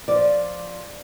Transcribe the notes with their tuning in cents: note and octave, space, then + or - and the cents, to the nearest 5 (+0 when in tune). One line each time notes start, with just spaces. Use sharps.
F3 +0 D5 +0